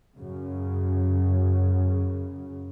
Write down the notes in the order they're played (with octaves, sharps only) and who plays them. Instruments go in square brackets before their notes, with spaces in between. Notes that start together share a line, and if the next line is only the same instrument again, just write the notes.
[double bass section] F#2 C#3